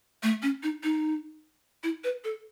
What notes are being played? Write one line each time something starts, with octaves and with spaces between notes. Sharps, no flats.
A3
C#4
D#4
D#4
E4
B4
A4